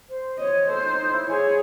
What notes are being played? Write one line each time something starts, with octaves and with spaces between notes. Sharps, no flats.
C5
C#5 D#5
A4 C5
D#4
D#4
E4
G#4 C#5